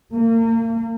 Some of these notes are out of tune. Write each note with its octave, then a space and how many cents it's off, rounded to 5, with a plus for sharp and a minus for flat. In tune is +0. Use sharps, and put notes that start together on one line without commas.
A#3 -35